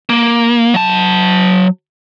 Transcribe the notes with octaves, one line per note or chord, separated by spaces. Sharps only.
A#3
F#3 A5